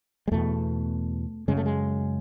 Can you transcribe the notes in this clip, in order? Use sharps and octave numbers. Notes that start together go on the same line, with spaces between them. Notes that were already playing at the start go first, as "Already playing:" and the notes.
G#3
E2 B2 A3
F#2 C#3 G#3
A3
G#3